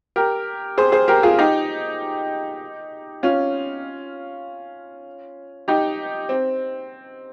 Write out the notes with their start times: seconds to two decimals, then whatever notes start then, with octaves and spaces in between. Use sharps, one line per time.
0.16 G4 A#4
0.78 G#4 C5
0.92 G#4 C5
1.08 G4 A#4
1.23 F4 G#4
1.39 D#4 G4
3.23 C#4 F4
5.68 D#4 G4
6.29 C4